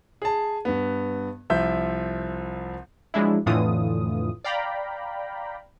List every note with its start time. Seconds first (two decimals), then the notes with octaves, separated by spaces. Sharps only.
0.22 G#4 A5
0.65 G2 B3
1.50 C2 F3 E5 G6
3.14 F3 F#3 G#3 D4 E4
3.46 F2 A2 D3 E3 F4 D#6
4.44 D5 F5 G5 A#5 B5